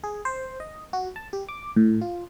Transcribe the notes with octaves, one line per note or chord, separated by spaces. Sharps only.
G#4
C5
D#5
F#4
A5
G4
D6
A2
F4